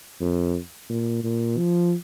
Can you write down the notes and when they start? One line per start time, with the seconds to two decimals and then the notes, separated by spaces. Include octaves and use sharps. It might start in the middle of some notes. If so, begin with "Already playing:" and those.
0.21 F2
0.89 A#2
1.24 A#2
1.58 F3